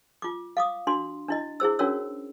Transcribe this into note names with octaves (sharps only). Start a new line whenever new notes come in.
F4 D6
F5 D6 D#6
D4 F#4 C6
D4 E4 D#5
E4 G#4 C5 E6
C#4 D4 F#4 A#4 C#5 E6